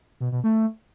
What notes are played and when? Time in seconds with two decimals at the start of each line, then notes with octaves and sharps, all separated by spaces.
0.20 B2
0.32 B2
0.44 A3